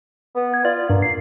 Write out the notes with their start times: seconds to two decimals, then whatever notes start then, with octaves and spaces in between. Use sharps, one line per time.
0.36 B3
0.54 G#6
0.65 F4 D5
0.90 G2 A#3
1.02 C7